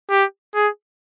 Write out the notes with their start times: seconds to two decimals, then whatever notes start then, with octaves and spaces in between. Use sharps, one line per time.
0.10 G4
0.55 G#4